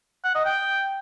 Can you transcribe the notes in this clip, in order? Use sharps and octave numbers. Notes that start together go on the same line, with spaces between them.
F#5
D#5
G5